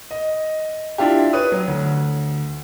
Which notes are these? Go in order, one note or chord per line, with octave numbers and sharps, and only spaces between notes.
D#5
D4 E4 F4 G4
B4 C#5 D#6
F#3
D2